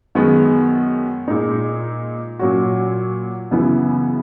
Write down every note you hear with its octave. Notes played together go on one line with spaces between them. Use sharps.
F#2 D#3 G#3 B3 F#4
A#2 G#3 D#4
A#2 F#3 C#4 F#4
F#2 C#3 E3 B3 E4